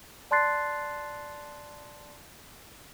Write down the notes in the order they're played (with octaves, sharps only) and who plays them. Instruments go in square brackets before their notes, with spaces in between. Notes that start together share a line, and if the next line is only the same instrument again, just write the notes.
[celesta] D5 A5 C6 F#6 A6 C7